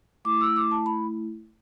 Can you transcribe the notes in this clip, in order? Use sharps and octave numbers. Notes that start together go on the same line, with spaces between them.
A3 E4 D6
E6
D6
A5
B5